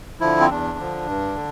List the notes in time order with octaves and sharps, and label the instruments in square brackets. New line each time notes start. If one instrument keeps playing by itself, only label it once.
[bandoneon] D3 F3 E4
C4
E2 D4
D3 F3
G2
D3